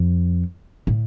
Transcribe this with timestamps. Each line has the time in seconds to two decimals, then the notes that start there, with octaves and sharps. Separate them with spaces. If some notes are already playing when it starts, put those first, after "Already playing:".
Already playing: F2
0.87 A2